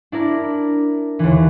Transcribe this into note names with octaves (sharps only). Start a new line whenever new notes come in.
D4 E4 A#4
D#2 D3 E3